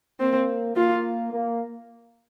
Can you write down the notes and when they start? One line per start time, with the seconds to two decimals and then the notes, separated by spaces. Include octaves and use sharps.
0.20 A#3 C4
0.76 A#3 F4
1.32 A#3